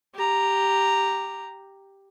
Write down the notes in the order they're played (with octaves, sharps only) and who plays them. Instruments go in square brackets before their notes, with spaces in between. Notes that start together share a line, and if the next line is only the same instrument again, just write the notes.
[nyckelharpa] G4 A#5